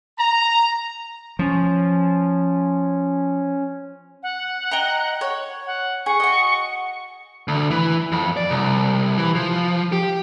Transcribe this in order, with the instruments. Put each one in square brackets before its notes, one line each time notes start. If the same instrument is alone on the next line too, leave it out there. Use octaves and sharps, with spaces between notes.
[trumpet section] A#5
[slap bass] F3 [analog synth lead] C#4
[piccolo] F#5
[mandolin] D#5 G5 A#5
C#5
[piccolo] F#5
[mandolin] G#4 [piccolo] C#6
[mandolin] F#4 D#5
[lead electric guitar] D2
E3
F2
D5
C2
E3
F3
G4